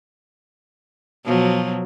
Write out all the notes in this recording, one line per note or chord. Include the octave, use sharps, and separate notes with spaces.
B2 F3 F#3